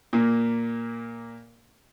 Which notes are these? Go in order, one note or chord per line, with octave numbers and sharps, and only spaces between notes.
A#2 A#3